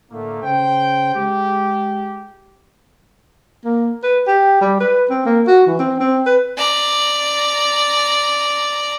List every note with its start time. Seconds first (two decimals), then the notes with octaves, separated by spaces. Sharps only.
0.11 A2 D3 A3 A#3
0.42 C#3 C5 G5
1.15 G#3 G4
3.65 A#3
4.04 B4
4.27 G4
4.61 G3
4.80 B4
5.10 C4
5.26 A#3
5.48 F#4
5.67 E3
5.79 C4
6.00 C4
6.26 B4
6.57 D5 A#5